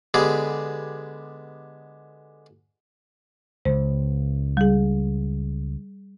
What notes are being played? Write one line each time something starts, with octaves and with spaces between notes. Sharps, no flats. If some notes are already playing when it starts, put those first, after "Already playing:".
D3 G#3 B3 G4 G#4
C#2 C5
G3 G#4